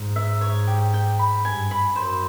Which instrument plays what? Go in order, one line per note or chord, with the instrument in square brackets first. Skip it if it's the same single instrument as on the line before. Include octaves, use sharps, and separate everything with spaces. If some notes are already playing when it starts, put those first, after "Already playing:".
Already playing: [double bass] G#2
[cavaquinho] E5
C#5
G4
G5
B5
[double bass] G2 [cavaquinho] G#5
[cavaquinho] B5
[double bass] F#2 [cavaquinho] C5